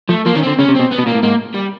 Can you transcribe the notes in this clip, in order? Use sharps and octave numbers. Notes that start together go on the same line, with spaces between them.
F3 A3
F3 A#3
D#3 C#4
D3 C4
C#3 C#4
C3
B2 C4
B3
B2
A#2 A#3
A2
G#2 A#3
G3